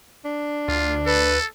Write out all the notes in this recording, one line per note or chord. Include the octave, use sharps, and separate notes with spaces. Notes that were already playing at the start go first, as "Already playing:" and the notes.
D4
D2 F4
A4 B4